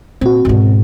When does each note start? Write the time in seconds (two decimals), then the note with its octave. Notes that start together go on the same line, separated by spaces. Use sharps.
0.21 A#2 C4 F#4
0.45 G#2 B2